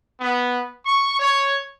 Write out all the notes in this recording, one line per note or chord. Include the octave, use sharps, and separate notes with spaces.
B3
C#6
C#5